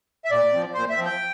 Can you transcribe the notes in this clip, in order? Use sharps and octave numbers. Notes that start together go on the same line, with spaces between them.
E5
A#2 D5
F3 C4
A#2 C5
E5
F3 C4
G5